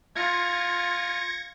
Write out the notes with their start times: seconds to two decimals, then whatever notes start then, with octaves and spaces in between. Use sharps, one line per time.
0.16 F4 G#6 A#6 C#7